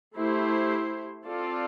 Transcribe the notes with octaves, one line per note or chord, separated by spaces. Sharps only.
A3 E4 G4 C5
C4 F4 A4 D5